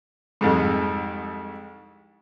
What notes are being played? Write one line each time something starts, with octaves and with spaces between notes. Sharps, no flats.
C2 F2 G#2